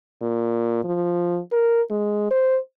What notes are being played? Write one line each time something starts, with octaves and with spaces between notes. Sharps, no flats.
A#2
F3
A#4
G#3
C5